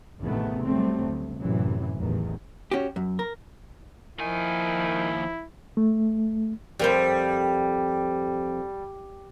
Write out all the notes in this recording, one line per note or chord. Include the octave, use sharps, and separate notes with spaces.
A1 E2 C3 D#3 A3 B3
F#3 G3 A3 C4
D2
F#2 A2 C3 E3 F#3
A1 E2 D#3
C#4 F#4 G4
F#2
A#4
D#2 D#3 F3 E4 G#5
A3
F2 G3 A#4 C5